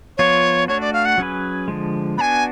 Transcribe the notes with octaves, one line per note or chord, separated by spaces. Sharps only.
F3 B3 F4 C#5
A3 D4 F#4 C#5
D5
F5
F#5
F#3 C#4 G#4 B4
D3 F3 G#3
B3 D4 F#4 G#5 B5